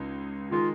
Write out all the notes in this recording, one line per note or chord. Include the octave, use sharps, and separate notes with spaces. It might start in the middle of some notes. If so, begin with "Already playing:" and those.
Already playing: C#2 C#3 G#3 D#4 G#4
D#3 G#3 D#4 F4